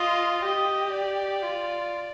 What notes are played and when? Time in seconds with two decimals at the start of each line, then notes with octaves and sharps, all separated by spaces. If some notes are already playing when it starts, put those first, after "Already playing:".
Already playing: F4 D#5
0.42 G4 D#5
0.92 D5
1.42 F4